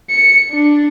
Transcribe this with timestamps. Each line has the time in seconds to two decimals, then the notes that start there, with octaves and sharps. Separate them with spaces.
0.10 C#7
0.51 D4